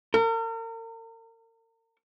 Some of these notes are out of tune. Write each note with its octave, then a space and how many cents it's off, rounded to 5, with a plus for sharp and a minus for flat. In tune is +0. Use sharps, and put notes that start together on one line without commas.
A#4 -40